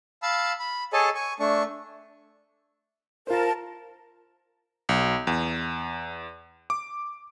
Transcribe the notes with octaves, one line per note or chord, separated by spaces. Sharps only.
F5 A5 B5 E6
B5
G#4 A4 C#5 D#5 G#5 A5
G#5 C#6
A3 D4 C#6
F4 A#4 C5 A5
B1
E2
D6